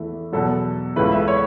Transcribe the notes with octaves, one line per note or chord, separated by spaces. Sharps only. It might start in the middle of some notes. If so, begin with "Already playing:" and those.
Already playing: E2 E3 A3
E2 B2 F#3 A4
C#2 C#3 E3 A3 B4
E5
C#5